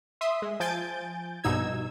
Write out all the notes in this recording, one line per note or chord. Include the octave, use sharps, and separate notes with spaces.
E5 C6 D#6
G#3
F3 G#5 G6 A6 D7
A#1 G2 B2 D#4 E6 G#6